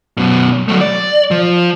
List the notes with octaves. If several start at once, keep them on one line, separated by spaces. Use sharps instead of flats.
F#2 B2
F#3 A3
D5
F3